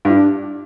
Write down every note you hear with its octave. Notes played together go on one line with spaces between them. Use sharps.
G2
E4
D4